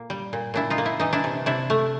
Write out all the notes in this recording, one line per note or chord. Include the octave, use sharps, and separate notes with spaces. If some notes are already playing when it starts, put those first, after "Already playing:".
Already playing: A#2 A#3
G3
A#2
A#2 D4 E4
D#4 F4
A#3
E4
E3 D#4
D4 E4
C3
C3 D4 E4
A3